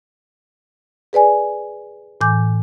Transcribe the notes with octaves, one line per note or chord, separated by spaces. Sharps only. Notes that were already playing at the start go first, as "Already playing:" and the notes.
G#4 B4 D5 G#5
A2 E3 G#5 D6 G6